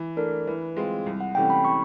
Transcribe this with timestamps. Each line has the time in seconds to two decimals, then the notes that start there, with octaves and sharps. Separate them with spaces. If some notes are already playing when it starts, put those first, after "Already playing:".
Already playing: E3
0.17 A3 D4 A#4
0.47 E3 B4
0.77 G#3 C4 F4
1.06 C2
1.21 F#5
1.35 C3 E3 A3 C#4 G5
1.50 B5
1.65 C#6